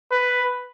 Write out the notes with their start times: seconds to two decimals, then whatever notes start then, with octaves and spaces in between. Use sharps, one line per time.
0.11 B4